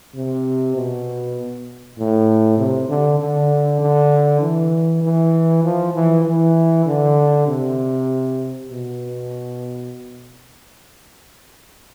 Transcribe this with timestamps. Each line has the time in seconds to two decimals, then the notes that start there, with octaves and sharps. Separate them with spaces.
0.15 C3
0.76 B2
1.98 A2
2.58 C3
2.89 D3
3.20 D3
3.81 D3
4.41 E3
5.03 E3
5.64 F3
5.94 E3
6.25 E3
6.86 D3
7.47 C3
8.69 B2